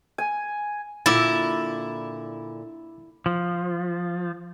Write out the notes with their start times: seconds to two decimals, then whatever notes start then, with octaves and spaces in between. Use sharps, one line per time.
0.18 G#5
1.06 A#2 D3 E4 D6 E6 A6
3.26 F3